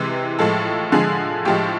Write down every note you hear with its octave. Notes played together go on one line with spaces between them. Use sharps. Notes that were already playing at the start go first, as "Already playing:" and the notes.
Already playing: C3 E3 G#3 G4
A2 F3 G#3 A4
D3 F3 G#3 G#4
A2 F3 G#3 G4